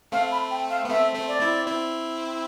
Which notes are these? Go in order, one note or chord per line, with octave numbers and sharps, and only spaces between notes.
A3 C4 F5
B5
G5
F5
B3
A3 C4 E5
A3 C4
D5
C4 E4
C4 E4